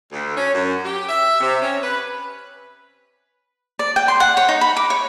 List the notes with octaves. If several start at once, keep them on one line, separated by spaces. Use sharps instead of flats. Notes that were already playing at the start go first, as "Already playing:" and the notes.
D2
C#4
F#2
G4
E5
C3
C#4
B4
D5
G5
C6
F#5
C#5
D#4
B5
D6
C#5